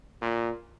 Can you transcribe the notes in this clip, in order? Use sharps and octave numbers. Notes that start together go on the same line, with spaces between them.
A#2